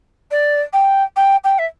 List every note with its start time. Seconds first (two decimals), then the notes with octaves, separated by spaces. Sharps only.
0.31 D5
0.73 G5
1.16 G5
1.44 G5
1.58 E5